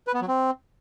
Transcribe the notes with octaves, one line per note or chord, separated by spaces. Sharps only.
B4
B3
F#3
C4